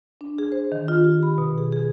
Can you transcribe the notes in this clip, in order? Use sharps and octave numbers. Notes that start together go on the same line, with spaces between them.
D4
G#4
C5
D#3
F4
G4
B5
B2
G#4
G#4